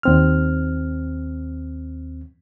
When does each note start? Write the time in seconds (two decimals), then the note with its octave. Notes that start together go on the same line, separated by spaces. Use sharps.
0.03 D#2 C4 F6